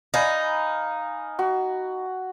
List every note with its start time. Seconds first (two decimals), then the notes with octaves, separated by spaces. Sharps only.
0.14 D#4 F5 G#5 B5
1.39 F#4